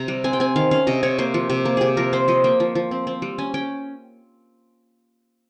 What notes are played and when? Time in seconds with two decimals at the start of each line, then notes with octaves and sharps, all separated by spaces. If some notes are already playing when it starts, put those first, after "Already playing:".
Already playing: C3 A#5
0.08 G3
0.24 C4 G#5
0.33 G5
0.40 C4 G#5
0.56 D#3 F5
0.71 C#4 F5
0.87 C3 D#5
1.03 C3 C#5
1.18 A#3 C5
1.34 F3
1.49 C3 G4
1.65 A#3
1.77 C3 G4 G#4
1.97 F3 A#4
2.13 C4 C5
2.28 F3 D#5
2.44 A#3 G5
2.60 F3
2.75 F3
2.91 C4
3.07 C4
3.22 G3
3.38 C#4 G#5
3.54 C#4 G5